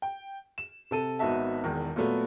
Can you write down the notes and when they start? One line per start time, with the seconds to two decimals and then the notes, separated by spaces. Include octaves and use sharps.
0.02 G5
0.58 E7
0.91 C3 A4 D#7
1.19 G#1 B3 D#4 F#4 E5 A5
1.63 E1 E2 D#3
1.96 A#2 F#3 A3 B3